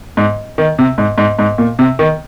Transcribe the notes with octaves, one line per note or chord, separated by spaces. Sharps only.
G#2
D#3
C3
G#2
G#2
G#2
A#2
C3
D#3